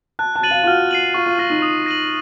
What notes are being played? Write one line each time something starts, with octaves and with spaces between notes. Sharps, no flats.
A5 F#6
A5
A6 D#7 F#7
F5
F4
F#4 F6
C7 D#7 F#7
F4 C#6
F4
F4 F6 A#6
D#4
D#6
A#6 D#7 F#7